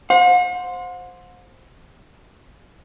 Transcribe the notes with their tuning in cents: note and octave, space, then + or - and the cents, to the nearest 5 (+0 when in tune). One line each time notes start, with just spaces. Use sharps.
C5 +0 F#5 -45